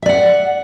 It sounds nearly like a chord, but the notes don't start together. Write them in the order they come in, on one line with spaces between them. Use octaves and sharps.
E5 D5 F#5